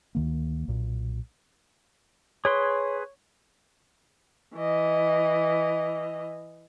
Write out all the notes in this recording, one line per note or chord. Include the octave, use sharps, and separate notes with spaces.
D2 D#3 A#3
B1 A#2
G#4 B4 C#5 C6
E3 D#5